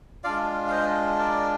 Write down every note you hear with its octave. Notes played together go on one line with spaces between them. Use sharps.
G#3 D4 F4 D5 F5
F5
C5 D#5
A#4 D5